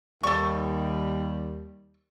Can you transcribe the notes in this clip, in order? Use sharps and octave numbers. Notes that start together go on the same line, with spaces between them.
D#2 G3 A4 C#6